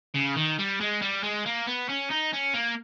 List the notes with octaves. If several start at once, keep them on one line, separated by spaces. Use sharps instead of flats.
C#3
D#3
G3
G#3
G3
G#3
A#3
B3
C#4
D#4
C#4
A#3